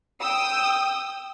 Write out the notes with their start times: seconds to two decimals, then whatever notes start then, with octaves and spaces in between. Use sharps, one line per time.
0.21 G5 D#6 E6